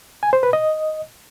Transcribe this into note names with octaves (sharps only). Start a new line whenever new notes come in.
G#5
C5
B4
D#5